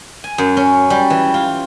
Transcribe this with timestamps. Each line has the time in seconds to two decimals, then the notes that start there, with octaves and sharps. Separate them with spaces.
0.24 G#5
0.38 F#2
0.57 C#4
0.90 G3
1.10 E3
1.34 F4